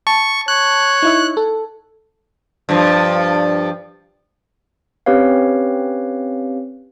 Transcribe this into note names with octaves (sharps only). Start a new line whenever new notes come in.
A5 C#6
C#5 F#6
D#4 E4 E5
A4
G2 F3
C4 C#4 G4 B4 C#5 F5